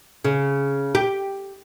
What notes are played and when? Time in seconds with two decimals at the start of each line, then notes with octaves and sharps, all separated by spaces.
0.25 C#3
0.95 G4